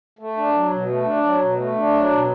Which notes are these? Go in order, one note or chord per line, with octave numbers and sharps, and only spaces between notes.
A3
D4
F#3
B2
A3
D4
F#3
B2
A3
D4
F#3
B2